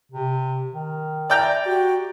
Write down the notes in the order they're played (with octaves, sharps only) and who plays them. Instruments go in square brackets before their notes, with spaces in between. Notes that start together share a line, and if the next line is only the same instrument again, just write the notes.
[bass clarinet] C3
D#3
[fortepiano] D5 G5 A#5 [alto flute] E5
[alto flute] F#4 [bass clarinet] G4